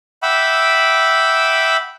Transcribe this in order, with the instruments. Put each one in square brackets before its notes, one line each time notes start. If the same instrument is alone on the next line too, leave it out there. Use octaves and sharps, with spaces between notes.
[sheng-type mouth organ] E5 F#5 G5 B5 D6 E6